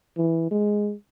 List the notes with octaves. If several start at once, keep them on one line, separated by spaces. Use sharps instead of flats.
E3
G#3